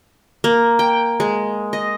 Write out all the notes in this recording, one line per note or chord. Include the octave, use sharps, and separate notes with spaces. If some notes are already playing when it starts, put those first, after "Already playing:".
A#3
G5
G#3
D#5